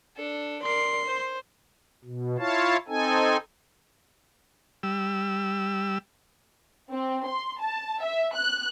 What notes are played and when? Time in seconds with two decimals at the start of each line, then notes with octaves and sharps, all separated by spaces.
0.16 D4 A4
0.62 A#4 D5 C6 C7
1.05 C5
2.04 B2
2.38 E4 F4 C#5 F5 A5
2.88 C4 D#4 A4 G#5
4.83 G3 E6
6.92 C4
7.28 C6
7.62 A5
8.04 E5
8.36 F#6